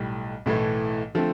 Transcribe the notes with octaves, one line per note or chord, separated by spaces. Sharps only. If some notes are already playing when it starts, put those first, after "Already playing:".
Already playing: B1 A2 G3
B1 A2 E3 A3
D3 F3 A3 C4